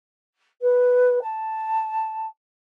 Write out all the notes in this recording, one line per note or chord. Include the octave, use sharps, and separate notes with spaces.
B4
A5